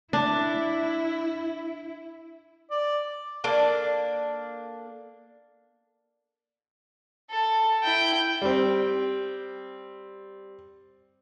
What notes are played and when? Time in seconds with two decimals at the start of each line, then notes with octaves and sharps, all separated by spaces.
0.13 D4 E4
2.71 D5
3.44 A#3 D4 A4
7.30 A4
7.83 E4 G5
8.42 G3 C4